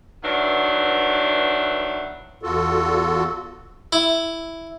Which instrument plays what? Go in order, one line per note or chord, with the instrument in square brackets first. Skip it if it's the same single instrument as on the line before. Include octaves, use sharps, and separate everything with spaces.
[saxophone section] D#3 E3 F#3 B3 D4
[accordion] E2 F4 F#4 A4
[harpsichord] E4